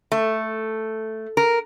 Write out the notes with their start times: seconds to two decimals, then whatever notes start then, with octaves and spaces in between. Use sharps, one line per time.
0.12 A3
1.37 A#4